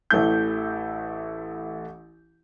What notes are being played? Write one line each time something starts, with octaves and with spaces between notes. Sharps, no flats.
A1 E3 A3 E4 G6